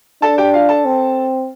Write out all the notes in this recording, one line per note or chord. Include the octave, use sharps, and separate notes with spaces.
D4 A4 A5
G4 G5
F4 F5
A4 A5
C4